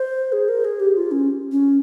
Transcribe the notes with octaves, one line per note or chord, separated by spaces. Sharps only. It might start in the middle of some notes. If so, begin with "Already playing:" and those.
Already playing: C5
G#4
A#4
G#4
G4
F4
C#4
C#4